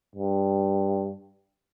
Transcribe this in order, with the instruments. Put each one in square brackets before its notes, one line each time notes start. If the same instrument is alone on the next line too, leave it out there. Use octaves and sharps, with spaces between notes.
[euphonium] G2